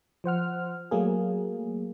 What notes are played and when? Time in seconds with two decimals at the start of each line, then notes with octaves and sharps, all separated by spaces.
0.24 F3 C5 F#5 F6
0.91 F#3 A3 A#3 G#4